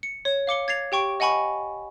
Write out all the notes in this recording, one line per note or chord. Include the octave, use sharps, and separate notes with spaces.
C#7
C#5
F5 D6 C#7 G7
G#6 A6 C7 F7
G4 G5 C#6 D7
D#5 F#5 G#5 B5 C#6